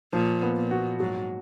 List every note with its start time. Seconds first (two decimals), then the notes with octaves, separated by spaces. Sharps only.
0.13 A#2 F3
0.42 B3
0.56 A#2
0.71 F#4
1.00 G#2 F#3